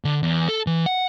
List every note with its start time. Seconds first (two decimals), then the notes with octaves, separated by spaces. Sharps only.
0.05 D3
0.23 E2
0.48 A4
0.67 E3
0.86 F#5